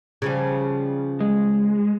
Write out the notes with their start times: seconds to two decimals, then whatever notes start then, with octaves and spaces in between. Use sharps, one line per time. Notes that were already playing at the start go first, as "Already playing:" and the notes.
0.22 C#3 F3 G3
1.21 G#3